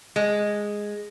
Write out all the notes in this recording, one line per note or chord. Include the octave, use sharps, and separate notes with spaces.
G#3